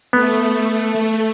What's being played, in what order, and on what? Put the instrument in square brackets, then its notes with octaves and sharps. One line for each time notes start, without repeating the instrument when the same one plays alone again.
[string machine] A3 [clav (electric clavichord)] B3